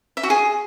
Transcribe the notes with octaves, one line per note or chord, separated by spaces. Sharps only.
E5
F#4
G#4